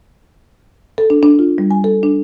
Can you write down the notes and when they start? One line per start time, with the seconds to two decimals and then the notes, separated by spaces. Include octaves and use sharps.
0.98 A4
1.10 D4
1.23 D4
1.39 F4
1.58 G3
1.71 G#5
1.84 A4
2.03 D4